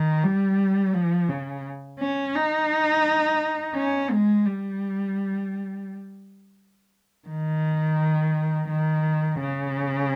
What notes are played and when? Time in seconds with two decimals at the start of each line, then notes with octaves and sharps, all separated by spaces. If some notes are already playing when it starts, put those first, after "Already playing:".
Already playing: D#3
0.24 G3
0.94 F3
1.29 C#3
2.00 C#4
2.35 D#4
3.76 C#4
4.11 G#3
4.47 G3
7.28 D#3
8.69 D#3
9.40 C#3